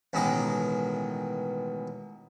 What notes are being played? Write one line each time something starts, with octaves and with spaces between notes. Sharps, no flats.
A1 B2 D#3 G#3 D#5 D6